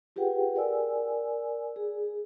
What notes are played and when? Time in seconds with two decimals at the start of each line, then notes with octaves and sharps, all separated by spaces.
0.16 F4 G4 G#4 B4 F#5 G5
0.55 A#4 D5 G#5 E6
1.76 G#4